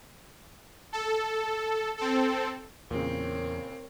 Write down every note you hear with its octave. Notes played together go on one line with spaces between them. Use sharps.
A4
C4 A4
E2 A#2 C#3 C4 A#4 C#5